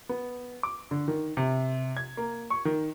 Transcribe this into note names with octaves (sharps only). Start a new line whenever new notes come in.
B3
D6
D3
D#3
C3
G#6
A#3
C#6
D#3